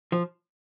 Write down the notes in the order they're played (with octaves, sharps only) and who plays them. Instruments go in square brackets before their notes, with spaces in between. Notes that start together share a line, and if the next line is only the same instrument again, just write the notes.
[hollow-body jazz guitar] F3